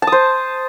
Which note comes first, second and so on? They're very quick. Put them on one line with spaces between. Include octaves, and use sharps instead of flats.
A5 D#6 C5